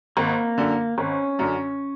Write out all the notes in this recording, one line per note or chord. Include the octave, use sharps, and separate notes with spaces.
G#1 A#3
F#2 D3
G#1 C#4
F#2 D3